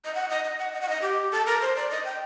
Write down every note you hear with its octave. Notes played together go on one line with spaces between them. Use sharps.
D#5
F#5
D#5
D#5
F#5
D#5
F#5
D#5
G4
A4
A#4
C5
D5
D#5
G5